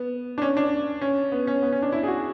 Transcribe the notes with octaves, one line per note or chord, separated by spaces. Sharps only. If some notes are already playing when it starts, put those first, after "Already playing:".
Already playing: B3
D4
C#4
D4
C#4
B3
C#4
B3
C#4
D4
E4
G#4
F#4